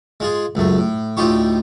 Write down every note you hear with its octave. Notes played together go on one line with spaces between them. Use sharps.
G#3 F4 G#4
C#2 F#2 A3
A2
D2 A2 D#4 F4 G4 C#6